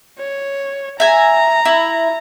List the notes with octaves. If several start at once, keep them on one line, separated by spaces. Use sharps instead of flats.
C#5
E5 G#5 A#5
E4